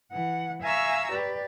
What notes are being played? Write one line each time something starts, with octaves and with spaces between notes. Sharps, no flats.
E3 F#5
E5 F5 G#5 A#5 C#6 E6
G4 B4 D5